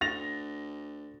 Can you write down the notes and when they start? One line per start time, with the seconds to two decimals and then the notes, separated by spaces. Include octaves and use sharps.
0.01 D2 A6 A#6 F7